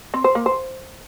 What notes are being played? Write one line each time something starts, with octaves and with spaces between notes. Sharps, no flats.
C4
C5
A#3
C5